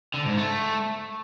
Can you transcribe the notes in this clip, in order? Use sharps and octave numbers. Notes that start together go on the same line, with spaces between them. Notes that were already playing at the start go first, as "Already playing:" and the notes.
D3
G#2
A3